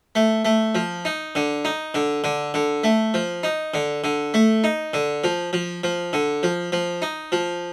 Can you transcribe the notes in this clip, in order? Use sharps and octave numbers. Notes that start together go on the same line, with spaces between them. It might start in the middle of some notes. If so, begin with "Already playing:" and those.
A3
A3
F3
D#4
D3
D#4
D3
D3
D3
A3
F3
D#4
D3
D3
A3
D#4
D3
F3
F3
F3
D3
F3
F3
D#4
F3